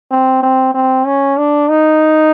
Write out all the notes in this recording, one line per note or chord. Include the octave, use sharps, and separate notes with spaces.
C4
C4
C4
C#4
D4
D#4